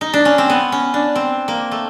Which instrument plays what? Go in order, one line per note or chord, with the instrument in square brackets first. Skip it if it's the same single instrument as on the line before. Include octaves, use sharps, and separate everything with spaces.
[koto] D#4
D4
C#4
C4
B3
C#4
D4
C4
A#3
A3